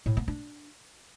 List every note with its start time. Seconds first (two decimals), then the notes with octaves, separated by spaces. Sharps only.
0.06 A2
0.17 B3
0.28 D4